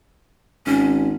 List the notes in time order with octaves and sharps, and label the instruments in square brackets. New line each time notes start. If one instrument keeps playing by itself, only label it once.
[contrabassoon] G#1 [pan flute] C#4